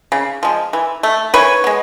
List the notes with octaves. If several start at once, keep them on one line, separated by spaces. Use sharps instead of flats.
C#3
F3 G#3
E3
A3
E3 B4 C#5
G#3 B3